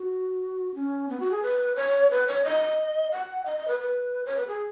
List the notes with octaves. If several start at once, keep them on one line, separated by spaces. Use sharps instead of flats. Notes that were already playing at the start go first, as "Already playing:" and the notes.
Already playing: F#4
C#4
B3
F#4
G#4
B4
C#5
B4
C#5
D#5
F#5
D#5
D#5
B4
B4
C#5
B4
G#4